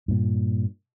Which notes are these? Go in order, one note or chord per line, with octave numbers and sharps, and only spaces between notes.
G2 A#2